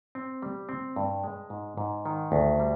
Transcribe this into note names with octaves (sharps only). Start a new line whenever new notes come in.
C4
G3
C4
G2
G#3
G#2
G#2
D#3
D2
G3